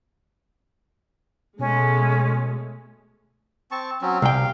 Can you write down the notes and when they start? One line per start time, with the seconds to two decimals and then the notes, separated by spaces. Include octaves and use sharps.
1.59 B2 G#3 A3 B3 C#4
3.71 C4 A5 C#6
4.02 F#3 C4 C#4
4.22 C2 F5 G5